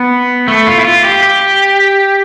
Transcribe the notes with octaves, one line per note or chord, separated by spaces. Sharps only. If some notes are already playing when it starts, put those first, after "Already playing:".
Already playing: B3
A3
F4
E4
F4
G4
G4